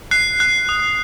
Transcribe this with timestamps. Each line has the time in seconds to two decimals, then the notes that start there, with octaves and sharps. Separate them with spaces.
0.11 F#6 C7
0.40 F#6
0.69 D#6